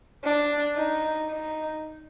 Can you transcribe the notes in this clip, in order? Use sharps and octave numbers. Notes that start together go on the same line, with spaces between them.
D4
D#4
D#4